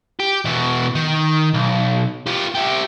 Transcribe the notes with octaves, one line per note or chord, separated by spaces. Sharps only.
G4
B2 E3
D#3
B1
F4 G4
E4 G4